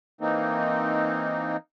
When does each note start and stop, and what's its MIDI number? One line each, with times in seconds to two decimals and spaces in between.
0.21 1.57 52
0.21 1.57 58
0.21 1.57 60
0.21 1.57 63